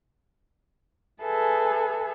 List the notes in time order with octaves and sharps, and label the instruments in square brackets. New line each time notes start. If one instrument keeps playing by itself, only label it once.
[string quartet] G#4 A4 B4 E5 G#5